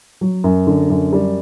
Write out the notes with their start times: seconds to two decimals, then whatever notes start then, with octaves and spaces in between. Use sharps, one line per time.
0.21 F#3
0.44 F#2
0.67 D3
0.90 F#2
1.13 G3